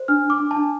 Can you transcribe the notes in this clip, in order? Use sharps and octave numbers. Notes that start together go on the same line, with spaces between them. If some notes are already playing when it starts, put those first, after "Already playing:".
Already playing: C5
D4 F6
D4
D6
D4
A5
D4